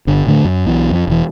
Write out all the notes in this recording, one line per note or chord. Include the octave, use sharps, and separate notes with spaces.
G1 D3
A2 D3 A3
F#2
B1 B2 E3
F2
E1 E3